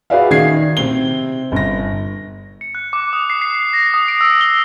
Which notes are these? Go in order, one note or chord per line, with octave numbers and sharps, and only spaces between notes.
F#4 G#4 B4 D5 E5 F5
D#3 G#6 C7
C3 C4 G7
G1 A#6
C#7
F#6
D6
D#6
C7
C7
A#6
D#6
D7
E6
G7